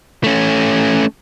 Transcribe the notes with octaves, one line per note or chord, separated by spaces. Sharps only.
A3 C#4